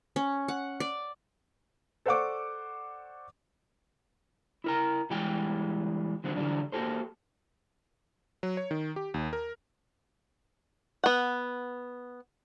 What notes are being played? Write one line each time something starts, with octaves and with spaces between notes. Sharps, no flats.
C#4
F#5
D5
A4 C5 D5 F#5 C#6 D6
E4 A#4 A#5
E2 E3 G3 G#3 G#4 G5
D3 D#3 F#3 C4
D3 E3 F#3 G3 D4
A#3 F#4 G4 A4 C5
F#3
C#5
D#3
G4
D#2
A#4
B3 F#5